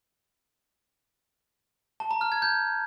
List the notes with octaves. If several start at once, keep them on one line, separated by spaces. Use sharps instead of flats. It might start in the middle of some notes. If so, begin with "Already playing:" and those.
A5
A#5
F6
G#6
G6